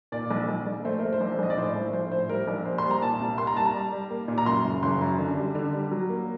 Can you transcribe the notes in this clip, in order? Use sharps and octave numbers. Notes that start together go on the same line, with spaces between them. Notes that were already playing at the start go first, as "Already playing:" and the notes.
A#2 D5
A#1
A#1
A#1
A3 C5
A3 A#4
C5
A#1
A#1 D#5
D5
A2 C5
A#1
A#1 C5
A2 C5
G3 A#4
A#1
A#3 C5
C6
G3
A#5
A#2 A5
C2
A#3 C6
A#5
G3 A5
A#5
G3
G3
A#3
A#2
A#5
F#2 C6
F#1
F#1 C6
F#2
D3
G3
D3
G3
F#3
A#3